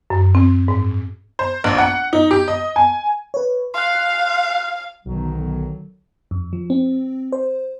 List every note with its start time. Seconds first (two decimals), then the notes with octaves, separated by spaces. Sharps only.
0.10 F#2
0.35 C4
0.68 G#2
1.39 C5
1.64 A#1
1.78 F#5
2.13 D#4
2.31 G4
2.48 D#5
2.76 G#5
3.34 B4 C#5
3.74 F5 C6 F#6
5.06 B1 D3 D#3 F#3
6.31 F2
6.53 F3
6.70 C4
7.32 C5